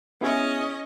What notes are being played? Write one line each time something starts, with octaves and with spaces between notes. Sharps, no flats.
B3 C#4 E4 G#4 D#5